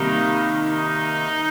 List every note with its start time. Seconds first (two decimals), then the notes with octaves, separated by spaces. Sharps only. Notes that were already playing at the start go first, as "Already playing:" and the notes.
Already playing: C3 D#3 G3 A#3 D#4
0.64 D#4